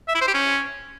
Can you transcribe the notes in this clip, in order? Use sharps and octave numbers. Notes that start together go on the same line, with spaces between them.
E5
E4
C5
G4
C#4